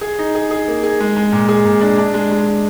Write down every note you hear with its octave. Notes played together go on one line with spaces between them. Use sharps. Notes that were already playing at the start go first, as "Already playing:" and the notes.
G#4
D#4
G#4
G#4
A#3
G#4
G#3
G#3
A#2
G#4
A#2
D4
D4
G#3
G#3
G#3